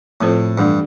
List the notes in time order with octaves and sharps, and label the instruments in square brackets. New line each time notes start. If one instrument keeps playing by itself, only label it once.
[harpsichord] A2 [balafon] F3 C4 F4 A4 C5
[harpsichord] G2 [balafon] E3 A3 D4 A4 D5